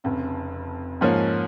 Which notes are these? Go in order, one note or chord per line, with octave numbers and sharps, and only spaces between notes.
F1 F2 C#3
G#2 F3 A#3 C#4